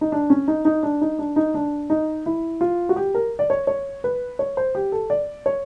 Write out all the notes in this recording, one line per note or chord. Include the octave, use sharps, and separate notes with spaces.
D#4
D4
C#4
D#4
D#4
D4
D#4
D4
D#4
D4
D#4
E4
F4
F#4
G4
A#4
D5
C#5
C#5
B4
C#5
C5
G4
A4
D5
C#5